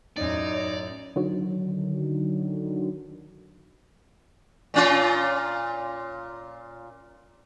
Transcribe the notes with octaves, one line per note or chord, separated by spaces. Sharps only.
F#2 A2 D#4 C#5 D5
D3 D#3 F#3
A#2 C#4 F4